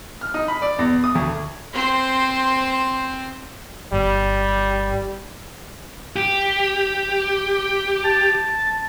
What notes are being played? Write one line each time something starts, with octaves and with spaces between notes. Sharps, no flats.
F6
D#4
B5
D5
E2
D#6
D2
C4 C5
G1 G3
G4
A5